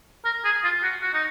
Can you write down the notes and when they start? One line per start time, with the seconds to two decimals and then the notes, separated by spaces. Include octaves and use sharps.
0.25 A#4
0.45 G#4
0.64 F4
0.83 F#4
1.03 F#4
1.14 D#4